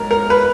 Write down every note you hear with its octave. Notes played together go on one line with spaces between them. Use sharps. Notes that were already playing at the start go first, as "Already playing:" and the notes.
Already playing: G#2 F#3 A#4
A#4
B4